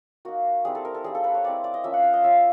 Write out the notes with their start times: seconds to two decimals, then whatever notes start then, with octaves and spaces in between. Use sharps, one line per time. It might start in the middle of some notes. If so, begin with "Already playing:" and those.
0.25 A#3 D#4 F#4
0.65 G3 C4 E4 G#4
0.75 A4
0.85 A#4
0.95 A4
1.04 G3 A#3 D#4 G#4
1.15 A4
1.24 B4
1.34 C#5
1.44 G#3 C4 E4 D5
1.64 D5
1.74 D#5
1.84 F3 A#3 C#4 E5
1.94 F#5
2.04 F5
2.13 D#5
2.23 G#3 C#4 F4 E5